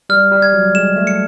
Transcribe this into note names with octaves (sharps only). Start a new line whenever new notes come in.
G3 F6
G3
G#6
F#3
G#3 E7
A3
C#7